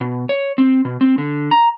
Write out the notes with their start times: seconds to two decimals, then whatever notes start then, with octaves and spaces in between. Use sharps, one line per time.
0.01 B2
0.29 C#5
0.58 C4
0.85 B2
1.01 C4
1.18 D3
1.51 A#5